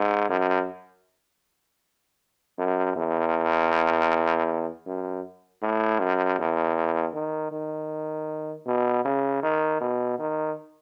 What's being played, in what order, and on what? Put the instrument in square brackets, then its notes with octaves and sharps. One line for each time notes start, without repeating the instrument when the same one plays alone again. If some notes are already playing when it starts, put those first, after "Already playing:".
Already playing: [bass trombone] G#2
F#2
F#2
E2
F#2
A2
F#2
E2
D#3
D#3
B2
C#3
D#3
B2
D#3